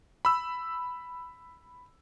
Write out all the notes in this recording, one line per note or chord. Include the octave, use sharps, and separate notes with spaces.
B5 E6